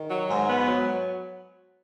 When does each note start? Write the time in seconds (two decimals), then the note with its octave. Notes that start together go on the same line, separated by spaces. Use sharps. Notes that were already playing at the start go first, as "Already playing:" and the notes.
Already playing: D#3
0.10 F#3
0.29 G#2
0.47 B3
0.67 F#3